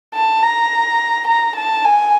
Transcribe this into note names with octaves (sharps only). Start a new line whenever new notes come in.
A5
A#5
A#5
A5
G#5